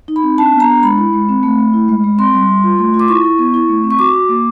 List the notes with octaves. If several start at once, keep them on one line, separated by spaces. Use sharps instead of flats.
D#4
B5
C4
D4 A5
B3
A#5
D4
G#3 B5
E4
G#3
C4
A3
A3
E4
G#3
G#3
C4 C6
G3
G3
F4
A3
F4
D6
E4 C#6
E4
B3
E4
A3
C4
C#6
F#4 D6
F#4
A#3